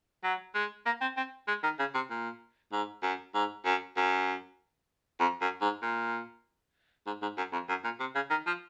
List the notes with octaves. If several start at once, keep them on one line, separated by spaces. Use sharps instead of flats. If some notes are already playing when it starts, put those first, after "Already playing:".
F#3
G#3
A#3
C4
C4
G#3
D#3
C#3
C3
A#2
G#2
F#2
G#2
F#2
F#2
F2
F#2
G#2
A#2
G#2
G#2
F#2
F2
F#2
A#2
C3
C#3
D#3
F3